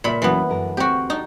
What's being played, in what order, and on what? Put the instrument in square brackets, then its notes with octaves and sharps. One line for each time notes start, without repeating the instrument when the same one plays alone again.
[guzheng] A#2 B5 [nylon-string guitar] C#3 E5
[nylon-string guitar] E2 F#3 C#4 [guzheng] E3 B3
[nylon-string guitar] F#2 D3 A#4
[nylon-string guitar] D2 C4 A#4 [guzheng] F#4 G4
[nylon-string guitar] D4 [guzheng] D#4